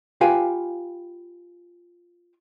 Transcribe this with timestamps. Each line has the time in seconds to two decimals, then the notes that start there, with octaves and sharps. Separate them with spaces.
0.21 F4 G4 B4 F5 G5 G#5